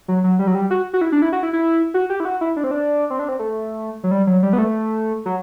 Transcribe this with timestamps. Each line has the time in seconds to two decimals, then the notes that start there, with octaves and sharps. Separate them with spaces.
0.08 F#3
0.24 F#3
0.39 G3
0.47 F#3
0.55 G3
0.71 F#4
0.93 F#4
1.01 E4
1.12 D4
1.22 E4
1.32 F#4
1.43 E4
1.53 E4
1.94 F#4
2.10 G4
2.20 E4
2.25 F#4
2.41 E4
2.57 D4
2.64 C4
2.71 D4
3.10 C4
3.19 D4
3.29 C4
3.39 A3
4.04 F#3
4.11 G3
4.27 F#3
4.43 G3
4.53 B3
4.58 A3
5.26 F#3